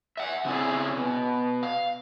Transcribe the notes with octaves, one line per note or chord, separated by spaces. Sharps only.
E5 F#5
C#3 C4 E4 G#4
B2
F5